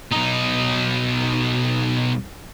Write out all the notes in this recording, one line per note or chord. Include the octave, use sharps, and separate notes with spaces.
B1 D#4